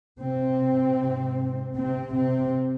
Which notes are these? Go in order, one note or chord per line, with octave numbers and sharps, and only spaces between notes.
C3 C4
G#2
C3 C4
C3 C4